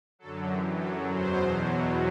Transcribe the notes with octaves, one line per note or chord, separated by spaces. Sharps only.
F#2 D3 F#3 A4
F#2 E3 G4
F#2 F#3 A4
E2 B2 F#3 C5
E2 B2 F#3
E2 B2 F#3